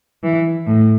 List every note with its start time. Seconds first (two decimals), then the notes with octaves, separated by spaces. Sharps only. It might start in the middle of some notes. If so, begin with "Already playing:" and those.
0.23 E3
0.67 A2